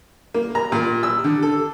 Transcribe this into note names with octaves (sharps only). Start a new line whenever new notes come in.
A#3
A#5
A#2
E6
D3
A4